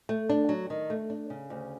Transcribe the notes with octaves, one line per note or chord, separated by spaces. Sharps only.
A3
D4
F#3
D#3
A3
D4
C#3
D2